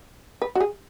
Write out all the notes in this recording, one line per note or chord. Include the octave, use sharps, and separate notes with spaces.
B4
F#4
G#4